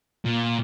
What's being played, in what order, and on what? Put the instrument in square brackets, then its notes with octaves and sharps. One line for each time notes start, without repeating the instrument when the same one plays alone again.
[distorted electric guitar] A#2